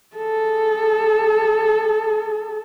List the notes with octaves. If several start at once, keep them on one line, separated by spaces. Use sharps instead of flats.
G#4 A4